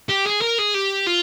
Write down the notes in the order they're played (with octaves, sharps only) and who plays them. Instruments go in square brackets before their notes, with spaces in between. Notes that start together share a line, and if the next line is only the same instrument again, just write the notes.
[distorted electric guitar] G4
G#4
A#4
G#4
G4
F4